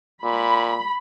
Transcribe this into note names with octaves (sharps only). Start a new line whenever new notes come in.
A#2 B5